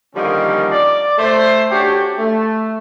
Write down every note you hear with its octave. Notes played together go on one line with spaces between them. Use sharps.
D3 D#3 F3 G3 A#3 C#4
D5
A3 C5
C#4 D4 F#4 G4 C#5 G5
A3